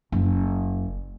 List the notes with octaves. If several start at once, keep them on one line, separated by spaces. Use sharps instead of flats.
F#1